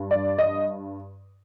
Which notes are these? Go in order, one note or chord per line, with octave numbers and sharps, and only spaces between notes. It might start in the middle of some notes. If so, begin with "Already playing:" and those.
Already playing: G2
D5
D#5